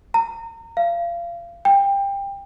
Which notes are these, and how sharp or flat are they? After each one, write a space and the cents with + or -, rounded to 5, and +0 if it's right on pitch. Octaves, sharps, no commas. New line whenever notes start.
A#5 -35
F5 -30
G5 +20